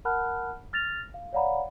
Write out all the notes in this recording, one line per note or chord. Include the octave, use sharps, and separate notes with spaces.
A#4 F#5 A5 B5 F6 F#6
F6 A6 A#6 F7
F5
C#5 D5 F5 F#5 A#5 B5